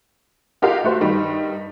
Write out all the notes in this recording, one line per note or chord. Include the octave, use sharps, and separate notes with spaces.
F4 G4 A#4 D#5 F5 F#5
A3 F#4 C5
G2 D#3 G3